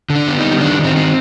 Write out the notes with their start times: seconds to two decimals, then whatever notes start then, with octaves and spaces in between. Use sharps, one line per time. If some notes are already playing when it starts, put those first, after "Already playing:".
0.10 D3
0.16 D4
0.27 B3
0.39 G3 D#4
0.61 D#3 D4
0.79 D#3
0.84 C4
0.96 C4